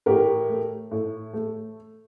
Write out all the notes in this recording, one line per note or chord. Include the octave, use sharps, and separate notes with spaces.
A2 G4 A#4
A3
A2
A3